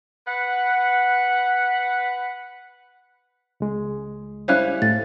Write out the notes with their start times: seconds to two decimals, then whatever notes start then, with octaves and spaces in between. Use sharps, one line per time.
0.28 B4 F#5
3.60 C#2 G#3
4.48 G3 C#4 E4 C5 F5 F#6
4.82 A2 A6